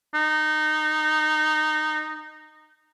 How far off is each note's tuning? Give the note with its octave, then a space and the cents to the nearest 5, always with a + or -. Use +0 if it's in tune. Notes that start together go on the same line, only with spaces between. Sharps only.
D#4 -15